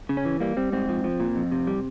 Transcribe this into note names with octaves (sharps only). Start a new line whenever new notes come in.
C#3
C#4
E3
G3 A#3
G3 C4
G#2 C4
F3
F3
A#2
F2
C3
G3